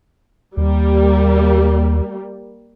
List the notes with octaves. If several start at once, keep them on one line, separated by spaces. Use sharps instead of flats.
D#2 G3 A#3